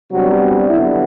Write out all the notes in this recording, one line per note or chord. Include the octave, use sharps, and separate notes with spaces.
C3 F#3 G3 B3 D4 F#4
D3 F#3 B3 E4